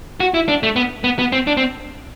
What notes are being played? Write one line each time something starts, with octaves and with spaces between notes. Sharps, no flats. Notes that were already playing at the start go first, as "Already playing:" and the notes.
F#4
E4
D4
A3
B3
B3
B3
C4
D4
C4